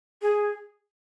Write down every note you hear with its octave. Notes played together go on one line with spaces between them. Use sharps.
G#4